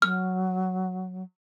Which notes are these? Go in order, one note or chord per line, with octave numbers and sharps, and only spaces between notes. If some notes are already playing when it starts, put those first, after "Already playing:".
F#3 F6